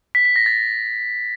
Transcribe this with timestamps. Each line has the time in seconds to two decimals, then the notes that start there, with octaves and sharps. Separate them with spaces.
0.15 B6
0.25 B6
0.36 A#6
0.46 A6